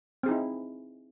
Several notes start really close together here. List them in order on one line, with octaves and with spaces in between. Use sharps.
C4 G#4 D#4 E4